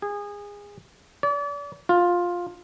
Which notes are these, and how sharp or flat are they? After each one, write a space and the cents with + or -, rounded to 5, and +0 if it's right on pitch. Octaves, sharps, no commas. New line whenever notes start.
G#4 -25
D5 -40
F4 +10